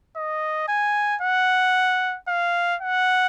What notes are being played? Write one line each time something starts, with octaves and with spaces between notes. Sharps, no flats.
D#5
G#5
F#5
F5
F#5